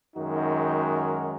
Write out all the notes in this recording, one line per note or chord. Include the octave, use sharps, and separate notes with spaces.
F#2 D#3 G#3 D#4 F#4